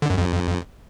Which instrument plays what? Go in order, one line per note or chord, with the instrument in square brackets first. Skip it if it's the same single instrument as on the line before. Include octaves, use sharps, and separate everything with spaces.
[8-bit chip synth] D3
F#2
F2